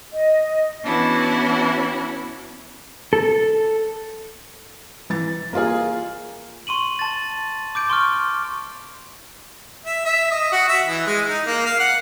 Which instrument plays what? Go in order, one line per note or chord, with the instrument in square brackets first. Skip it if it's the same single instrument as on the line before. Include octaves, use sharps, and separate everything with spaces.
[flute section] D#5
[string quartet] E3 B3 C#4 D4 E4 F#4
[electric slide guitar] A4
[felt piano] E3 A6
A#3 F4 G#4
[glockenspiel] C6 C#6 D#7 F#7
A5 A6
D6 G6 D7
C6 C#6 F6
[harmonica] E5
E5
D#5
F#4
E5
E3
G#3
D#4
A#3
F5
F#5